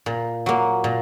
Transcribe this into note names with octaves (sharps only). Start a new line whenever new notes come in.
A#2
F#3 A#3
A#2